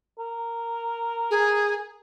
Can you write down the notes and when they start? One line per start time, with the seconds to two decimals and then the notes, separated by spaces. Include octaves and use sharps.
0.19 A#4
1.31 G#4